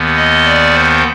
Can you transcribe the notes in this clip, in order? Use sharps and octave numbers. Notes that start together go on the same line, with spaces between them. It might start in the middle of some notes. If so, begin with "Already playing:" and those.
Already playing: D#2 D#3 B3
D#5
D5
C5